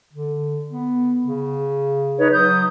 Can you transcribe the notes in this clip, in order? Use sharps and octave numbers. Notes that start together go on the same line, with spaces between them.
D3
B3
C#3
D#4 B4 C#5
F#3 D#6 G6